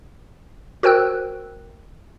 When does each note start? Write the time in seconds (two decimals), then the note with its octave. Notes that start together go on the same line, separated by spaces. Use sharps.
0.83 F#4 A#4 C5 G5 E6 F#6